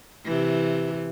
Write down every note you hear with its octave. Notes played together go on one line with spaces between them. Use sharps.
C3 E3